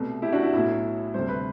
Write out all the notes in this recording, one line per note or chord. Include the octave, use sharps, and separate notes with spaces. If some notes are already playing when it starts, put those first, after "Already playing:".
Already playing: C2 B2 A3
E4 G4
D4 F#4
E4
B1 A2 F#3 E4
D2 C3 G3 C5
B4